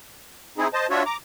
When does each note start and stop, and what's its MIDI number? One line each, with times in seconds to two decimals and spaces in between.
0.58 0.67 60
0.58 0.67 63
0.58 0.67 64
0.58 0.67 68
0.74 0.87 72
0.74 0.87 75
0.74 0.87 81
0.90 1.03 62
0.90 1.03 65
0.90 1.03 66
0.90 1.03 73
0.90 1.03 76
1.06 1.17 82
1.06 1.17 86